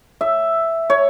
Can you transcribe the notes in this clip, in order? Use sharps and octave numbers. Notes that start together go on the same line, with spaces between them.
E5
C#5